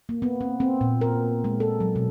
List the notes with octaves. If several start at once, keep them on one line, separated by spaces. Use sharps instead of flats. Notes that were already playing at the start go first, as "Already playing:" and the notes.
A#3
B3
C4
C4
A#2
A#4
G#3
A4
F#3
B2